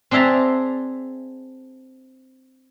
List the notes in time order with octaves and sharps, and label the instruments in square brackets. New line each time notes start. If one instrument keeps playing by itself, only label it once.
[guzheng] C4 D4 G#4 E5 A5 A#5